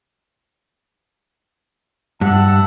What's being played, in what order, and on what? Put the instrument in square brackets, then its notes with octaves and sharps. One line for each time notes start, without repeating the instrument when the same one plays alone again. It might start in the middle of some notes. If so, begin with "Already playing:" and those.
[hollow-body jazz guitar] G2 [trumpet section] E5 F#5 A5